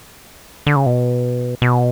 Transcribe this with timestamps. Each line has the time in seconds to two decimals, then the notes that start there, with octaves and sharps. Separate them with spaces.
0.66 D3
0.76 C#3
0.86 B2
1.62 B2